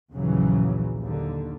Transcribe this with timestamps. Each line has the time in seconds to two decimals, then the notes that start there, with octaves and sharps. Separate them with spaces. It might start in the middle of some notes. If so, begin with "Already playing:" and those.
0.15 A#1 D#2 C#3 E3 F#3
1.00 D#2 D3